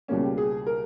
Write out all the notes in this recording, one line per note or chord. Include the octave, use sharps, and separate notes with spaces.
C#2 B2 G3 A#3 C#4
G4
G#4
A#4